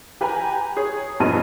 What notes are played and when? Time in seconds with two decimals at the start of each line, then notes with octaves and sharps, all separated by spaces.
0.21 G4 B4 G5 G#5 A#5
0.77 G#4 C#5
1.20 B1 G2 F3 B3 D#5 D#7